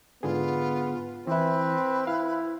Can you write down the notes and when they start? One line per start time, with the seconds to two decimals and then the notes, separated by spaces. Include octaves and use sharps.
0.23 G#2 D3 B3 F4 G#4
1.27 E3 C4 E4 B4
2.07 E4 F5